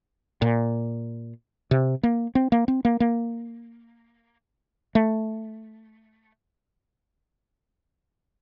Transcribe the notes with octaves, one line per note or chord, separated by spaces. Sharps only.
A#2
C3
A#3
C4
A#3
C4
A#3
A#3
A3